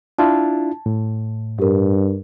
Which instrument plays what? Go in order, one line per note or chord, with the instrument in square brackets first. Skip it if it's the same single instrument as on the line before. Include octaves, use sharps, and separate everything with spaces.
[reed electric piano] D4 E4 F4 [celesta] A5
[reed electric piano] A2
[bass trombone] G2 [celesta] G4 A#4